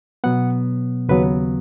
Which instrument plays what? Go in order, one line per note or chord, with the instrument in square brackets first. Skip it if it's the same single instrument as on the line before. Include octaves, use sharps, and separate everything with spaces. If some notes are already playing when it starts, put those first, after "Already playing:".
[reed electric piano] B2 F#3 B3 F#5
D#2 C#3 F#3 B3 B4